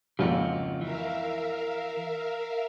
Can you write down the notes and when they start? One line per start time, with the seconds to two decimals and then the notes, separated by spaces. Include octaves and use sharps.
0.19 G#1 F2 C#3 A#3 F4 F#4
0.81 E3 A#4 E5 F5